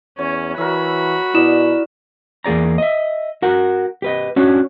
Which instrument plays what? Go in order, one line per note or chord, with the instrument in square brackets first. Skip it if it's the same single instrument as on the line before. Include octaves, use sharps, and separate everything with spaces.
[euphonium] E2 [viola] C#4 [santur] C#5
[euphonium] E3 [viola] F#4 B5 [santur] A#4 C#5 E5
[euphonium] B2 [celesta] E4 E7 [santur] D5 D#5
[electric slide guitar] E2 A#3 G#4 D5 A#5
D#5 E5
F#4 A#4 F#5
G4 B4 D#5
C#4 D4 F#4 C#5